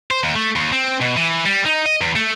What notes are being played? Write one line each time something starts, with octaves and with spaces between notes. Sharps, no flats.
C5
D#2
A3
D#2
C4
B2
E3
G3
D#4
D#5
E2
A3